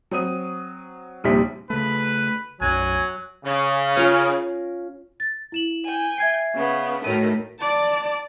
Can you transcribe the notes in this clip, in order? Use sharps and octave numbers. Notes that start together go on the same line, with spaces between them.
F#3 C4 D#6 D#7
A#1 D#2 C3 G3 B6
C#3 A3 B4
B1 F#2 F#3 G#5
C#3
C#4 F4 A#4
A6
E4 E7 F#7
G5 G#5
E5 G#6 C7
C#3 B3
A2 D#3 A3 F#4 C#5 D#7
D5 A5